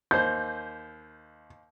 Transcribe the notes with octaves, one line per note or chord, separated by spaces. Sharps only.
D#2 C5 G6